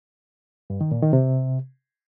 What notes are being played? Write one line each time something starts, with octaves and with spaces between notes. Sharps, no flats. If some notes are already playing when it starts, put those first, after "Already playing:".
G2
D#3
A#2
D#3
C3